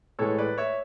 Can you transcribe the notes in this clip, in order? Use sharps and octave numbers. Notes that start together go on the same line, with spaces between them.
A2 E3 G#3 A4 C#5
B4 D5
C#5 E5